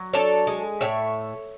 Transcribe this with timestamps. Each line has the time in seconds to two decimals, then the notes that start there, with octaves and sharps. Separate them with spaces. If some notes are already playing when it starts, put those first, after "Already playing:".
Already playing: F#3
0.14 D4 A4 C#5
0.47 G#3
0.81 A2 C#5 E5